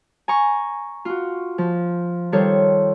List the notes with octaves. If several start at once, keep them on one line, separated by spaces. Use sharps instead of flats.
G#5 A#5 C#6
F4 F#4
F3
D#3 G3 F4 A4 C5 C#5